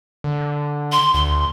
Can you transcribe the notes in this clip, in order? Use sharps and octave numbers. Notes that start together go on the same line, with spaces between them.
D3
C6
D2 C6